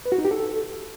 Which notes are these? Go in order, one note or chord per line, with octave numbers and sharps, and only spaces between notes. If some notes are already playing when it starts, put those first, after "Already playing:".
B4
F#4
D#4
G4
A4